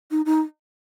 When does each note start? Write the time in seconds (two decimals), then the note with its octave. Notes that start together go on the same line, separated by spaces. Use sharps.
0.11 D#4
0.26 D#4